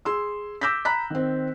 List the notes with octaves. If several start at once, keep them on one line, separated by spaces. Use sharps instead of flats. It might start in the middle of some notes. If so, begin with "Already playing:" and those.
G#4 C6 E6
D6 E6 G6 A#6 B6
A#5 B5 F#6 B6
D#3 C4